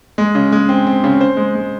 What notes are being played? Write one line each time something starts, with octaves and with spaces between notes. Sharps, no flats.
G#3
C#3
G#3
C4
C4
C#3
C5
G#3
G#3